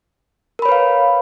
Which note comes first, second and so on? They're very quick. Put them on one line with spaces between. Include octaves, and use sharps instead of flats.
A#4 B5 C#5 B4 F5